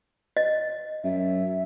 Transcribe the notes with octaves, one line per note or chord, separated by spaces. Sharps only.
D#5
F#2 E5